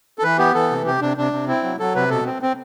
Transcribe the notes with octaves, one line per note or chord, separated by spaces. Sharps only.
A4
E3 B4
B3 G4
E3 A4
C3
C3 G4
C3 D4
C3 D4
C3
C4 E4
F#3
F#3 A4
C3 B4
B2 A4
C4
C4